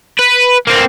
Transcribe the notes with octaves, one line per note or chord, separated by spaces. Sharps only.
B4
A#3 C4